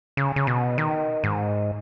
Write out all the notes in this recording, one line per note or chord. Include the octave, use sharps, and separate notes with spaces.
C#3
C#3
B2
D#3
G#2